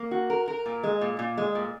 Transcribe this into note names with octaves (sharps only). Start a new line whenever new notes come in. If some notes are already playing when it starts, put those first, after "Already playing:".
Already playing: A#3
F#4
A#4
A#4
A#2
G#3
A#2
A#2
G#3
A#2